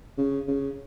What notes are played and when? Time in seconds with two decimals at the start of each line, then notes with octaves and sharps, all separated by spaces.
0.18 C#3
0.48 C#3